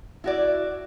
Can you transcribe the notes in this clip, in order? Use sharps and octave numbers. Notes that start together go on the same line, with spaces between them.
E4 F#4 D5